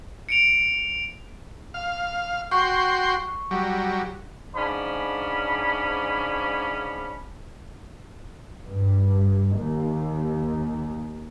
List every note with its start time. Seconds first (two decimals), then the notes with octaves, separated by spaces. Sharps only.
0.29 C#7 D7 F7
1.74 F5
2.51 F#4 G5 C6 C#6
3.51 F#3 G3
4.54 G#2 F3 C#4 D4 B5
8.66 G2
9.57 D#2